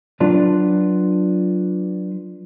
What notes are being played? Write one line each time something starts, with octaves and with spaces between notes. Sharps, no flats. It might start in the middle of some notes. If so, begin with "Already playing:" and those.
F#3 D4 F4 B4 D5